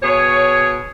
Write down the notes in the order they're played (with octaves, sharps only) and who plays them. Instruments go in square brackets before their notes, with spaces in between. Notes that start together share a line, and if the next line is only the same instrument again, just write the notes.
[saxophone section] B2 G#4 C#5